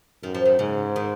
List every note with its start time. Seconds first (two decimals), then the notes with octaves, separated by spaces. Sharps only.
0.23 F#2 D#3
0.34 F3
0.46 D#3
0.59 G#2 C#3
0.96 D#3